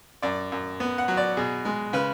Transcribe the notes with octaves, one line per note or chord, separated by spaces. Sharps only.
F#2 D5
F#2
B3
F#5
F#3
D5
B2 G#4
G#3
C#3 B4